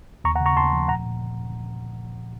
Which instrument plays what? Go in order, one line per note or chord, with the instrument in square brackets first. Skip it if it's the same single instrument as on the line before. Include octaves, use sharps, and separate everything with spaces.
[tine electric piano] D#2 A#5 C#6
F#5 A#5
C#3
A#5 C#6
D#2 A5 C6
F3
A#2 F#5 A#5
A#2